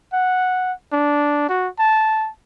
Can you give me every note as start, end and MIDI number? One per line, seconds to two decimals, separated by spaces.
0.13 0.72 78
0.93 1.48 62
1.49 1.68 66
1.79 2.29 81